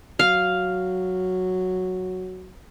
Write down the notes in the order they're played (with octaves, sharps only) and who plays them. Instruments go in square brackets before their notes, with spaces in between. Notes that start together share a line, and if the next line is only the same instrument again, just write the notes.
[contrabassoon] F#3 [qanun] F5